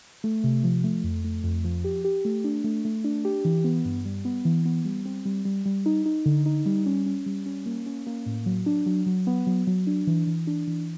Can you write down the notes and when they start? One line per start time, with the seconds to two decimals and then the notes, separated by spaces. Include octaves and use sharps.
0.24 A3
0.44 C3
0.64 F3
0.84 A3
1.04 F2
1.24 A3
1.44 F2
1.64 F3
1.84 G4
2.04 G4
2.25 A3
2.44 D4
2.64 A3
2.85 A3
3.04 D4
3.25 G4
3.45 E3
3.64 B3
3.85 G2
4.05 G3
4.25 B3
4.45 E3
4.65 B3
4.85 G3
5.05 C4
5.25 G3
5.45 G3
5.66 G3
5.86 D#4
6.06 D#4
6.26 D3
6.46 D#4
6.66 G3
6.86 C#4
7.06 C#4
7.26 G3
7.46 C#4
7.66 A#3
7.86 C#4
8.07 A#3
8.26 A2
8.46 F#3
8.66 D4
8.86 F#3
9.06 F#3
9.27 B3
9.47 F#3
9.67 F#3
9.87 D4
10.07 E3
10.27 E3
10.47 D4
10.67 E3